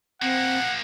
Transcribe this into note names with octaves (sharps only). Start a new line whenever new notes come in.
F3 A#3 C4 F#5